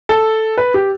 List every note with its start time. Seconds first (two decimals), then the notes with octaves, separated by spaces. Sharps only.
0.09 A4
0.58 B4
0.74 G4